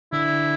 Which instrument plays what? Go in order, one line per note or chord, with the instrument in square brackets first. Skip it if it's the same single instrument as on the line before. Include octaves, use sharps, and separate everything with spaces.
[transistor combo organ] D3 [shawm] E4